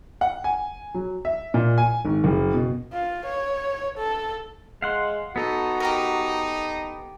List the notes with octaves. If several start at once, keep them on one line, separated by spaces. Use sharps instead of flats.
F#5
G#5
F#3
E5
A#2
G#5
G#1
F#1
B2
F4
C#5
A4
G#3 F5 F#5 C6
B3 D#4 F#4 A4 A#5
D#4 G4 A#4